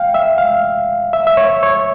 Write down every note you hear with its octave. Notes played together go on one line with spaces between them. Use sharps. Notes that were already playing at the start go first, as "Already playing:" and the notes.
Already playing: F5 G5
E5
F5
E5
E5
C#5
C#5